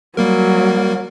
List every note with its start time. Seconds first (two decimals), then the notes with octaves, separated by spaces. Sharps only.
0.17 F#3 G3 A#3 A#4